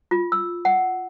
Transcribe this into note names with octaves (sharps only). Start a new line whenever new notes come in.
F4
E6
F#5